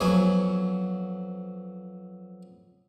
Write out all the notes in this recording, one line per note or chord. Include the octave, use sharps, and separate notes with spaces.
F2 F#3 B3 G#5